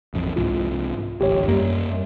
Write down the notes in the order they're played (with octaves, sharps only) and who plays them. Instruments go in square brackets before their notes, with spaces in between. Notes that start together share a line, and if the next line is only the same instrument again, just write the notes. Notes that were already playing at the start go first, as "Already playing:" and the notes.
[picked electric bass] A1 F2
[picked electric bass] C2 G#2 [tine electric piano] F4
[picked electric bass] D1 A1 [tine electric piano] G4 C#5
[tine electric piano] F#2 [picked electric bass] G3 A#3